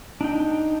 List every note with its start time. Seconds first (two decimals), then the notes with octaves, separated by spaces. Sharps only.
0.21 D4 D#4 G5